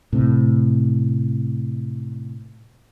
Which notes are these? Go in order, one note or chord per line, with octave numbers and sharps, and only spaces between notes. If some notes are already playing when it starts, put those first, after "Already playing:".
A2 C3